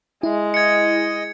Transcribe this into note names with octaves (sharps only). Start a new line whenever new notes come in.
G#3 E4
D#5 G#6 C#7